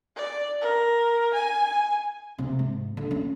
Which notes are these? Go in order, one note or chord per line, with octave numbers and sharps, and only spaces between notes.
D5
A#4
G#5
C3
G#2
D3
C#4